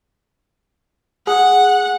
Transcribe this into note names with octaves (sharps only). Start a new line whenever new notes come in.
G#4 F#5